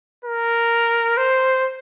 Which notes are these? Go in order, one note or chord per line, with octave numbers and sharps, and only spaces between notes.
A#4
C5